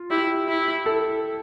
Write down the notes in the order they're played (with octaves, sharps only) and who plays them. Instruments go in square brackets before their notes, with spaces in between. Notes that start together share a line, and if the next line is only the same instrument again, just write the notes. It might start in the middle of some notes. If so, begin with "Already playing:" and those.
Already playing: [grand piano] F4
[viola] E4 [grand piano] G4
[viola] E4
[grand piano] A4